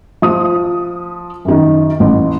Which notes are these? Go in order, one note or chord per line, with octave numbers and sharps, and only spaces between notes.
F3 D#6
F#2 D#3
A1